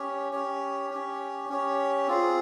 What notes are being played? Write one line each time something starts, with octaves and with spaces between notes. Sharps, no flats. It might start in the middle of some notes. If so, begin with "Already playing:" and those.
Already playing: C#4 G4 C#5
C#4 G4 C#5
C#4 G4 C#5
C#4 G4 C#5
C4 F4 G#4